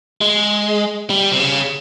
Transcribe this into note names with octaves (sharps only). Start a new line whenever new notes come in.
G#3
G3
C3
C#3